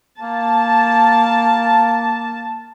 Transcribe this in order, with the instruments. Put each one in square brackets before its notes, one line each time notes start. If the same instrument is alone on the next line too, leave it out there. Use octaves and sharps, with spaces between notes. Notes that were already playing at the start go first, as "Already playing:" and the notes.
[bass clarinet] A#3 [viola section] A5